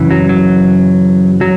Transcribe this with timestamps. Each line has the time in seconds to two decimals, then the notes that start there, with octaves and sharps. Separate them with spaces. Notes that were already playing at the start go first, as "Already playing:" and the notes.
Already playing: F#2 C#3 E3
0.11 F#3
0.29 F#3
1.41 F#3